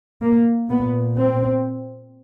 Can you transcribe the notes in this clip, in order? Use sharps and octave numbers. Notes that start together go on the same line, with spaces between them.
A#3
A#2 B3
C4